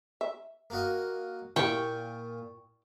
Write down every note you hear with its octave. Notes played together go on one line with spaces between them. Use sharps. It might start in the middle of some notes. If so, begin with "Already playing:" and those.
E5
A#3 F#4 D#5
A#2 E4 G4 G5 C#6